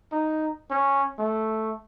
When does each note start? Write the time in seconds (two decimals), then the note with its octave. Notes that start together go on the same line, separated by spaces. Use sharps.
0.12 D#4
0.70 C#4
1.19 A3